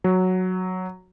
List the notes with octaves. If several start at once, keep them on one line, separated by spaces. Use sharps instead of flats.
F#3